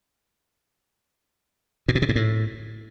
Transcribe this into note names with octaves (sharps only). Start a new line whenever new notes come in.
A#2
B2
C3
G#2
A2